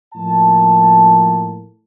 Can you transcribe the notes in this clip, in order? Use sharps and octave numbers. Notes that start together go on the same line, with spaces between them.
A2 F3 A#3 A5